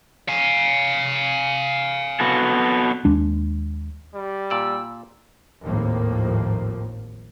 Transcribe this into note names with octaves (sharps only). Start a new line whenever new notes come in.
F5 G#5
B3 F#4 A4
D#2 G#3 D4
G3
A#2 D5 A5 E6
G#1 D#2 A2 F3 A#3